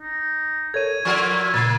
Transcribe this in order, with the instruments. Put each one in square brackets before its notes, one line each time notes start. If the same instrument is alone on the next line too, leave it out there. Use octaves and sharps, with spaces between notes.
[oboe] D#4
[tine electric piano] A4 A#4 C#5 [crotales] G#6 D#7
[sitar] F3 F4 A#4 [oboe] E4 [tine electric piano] C#6
[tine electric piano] A#2 C#3 [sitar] A#3 [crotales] A6 C7